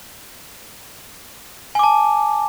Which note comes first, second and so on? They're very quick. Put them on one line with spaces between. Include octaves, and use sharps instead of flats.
G#5 D6 A5